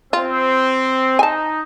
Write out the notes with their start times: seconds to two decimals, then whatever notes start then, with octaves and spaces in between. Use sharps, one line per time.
0.13 C4 F4
1.19 D#4 G#5 A5